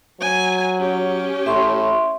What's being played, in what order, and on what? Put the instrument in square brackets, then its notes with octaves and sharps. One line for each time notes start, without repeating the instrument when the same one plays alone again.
[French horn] F#3 [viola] G#5
[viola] C#4 G4
[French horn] A2 [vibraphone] E5 C6 C#6